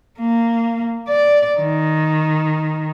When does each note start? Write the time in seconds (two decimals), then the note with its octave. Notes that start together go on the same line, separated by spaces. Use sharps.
0.19 A#3
1.08 D5
1.59 D#3